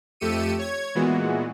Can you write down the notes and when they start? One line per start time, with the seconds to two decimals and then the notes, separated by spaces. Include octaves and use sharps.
0.20 F2 A3 G4 E6 C#7 D#7
0.59 C#5 G#6
0.95 A#2 E3 G#3 B3 F#4